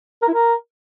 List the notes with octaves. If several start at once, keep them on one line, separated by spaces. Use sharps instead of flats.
A#4
E4
A#4